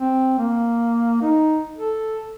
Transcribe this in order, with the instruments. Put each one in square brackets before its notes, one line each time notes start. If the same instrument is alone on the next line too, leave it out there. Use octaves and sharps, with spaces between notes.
[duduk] C4
A#3
D#4
A4